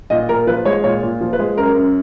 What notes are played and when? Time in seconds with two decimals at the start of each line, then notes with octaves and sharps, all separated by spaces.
0.10 A#2 D#5
0.29 A#2 A#4
0.47 F3 B4
0.65 G#3 C#5
0.84 A#2 C#5
1.02 A#2
1.21 F3
1.33 B4
1.39 G#3
1.57 F#2 A#4
1.76 F#2